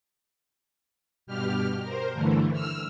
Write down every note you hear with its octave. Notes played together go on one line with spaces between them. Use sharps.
G2 B2 G4 F6
A#4 C5
G2 D3 E3 A3
E6 F6